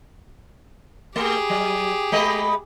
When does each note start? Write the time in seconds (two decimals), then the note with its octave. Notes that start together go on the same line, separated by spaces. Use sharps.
1.16 A3 G4 G#4
1.50 F#3
2.12 G#3 B3 D#5